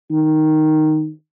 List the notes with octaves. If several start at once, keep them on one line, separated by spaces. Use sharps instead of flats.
D#3